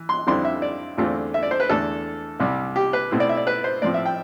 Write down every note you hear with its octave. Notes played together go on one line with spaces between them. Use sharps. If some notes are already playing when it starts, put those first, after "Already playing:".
Already playing: E3
C6
F2 D3 G3 C4 E4 C6
E5
D5
E2 D3 A3 C4 F4
E5
D5
C5
B4
E2 D3 A3 A4
C2 C3 G3
G4
B4
B2 A3 C4 E4
D5
E5
D5
B4
C5
A2 F3 C4 D5
E5
G5